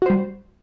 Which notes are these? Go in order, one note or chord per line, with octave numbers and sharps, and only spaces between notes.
G3 F#4 C5